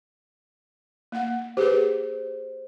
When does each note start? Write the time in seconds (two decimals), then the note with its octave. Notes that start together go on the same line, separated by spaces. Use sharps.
1.12 A#3 F#5
1.57 G4 G#4 B4 C5